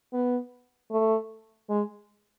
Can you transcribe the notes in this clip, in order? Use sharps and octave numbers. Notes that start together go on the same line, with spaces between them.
B3
A3
G#3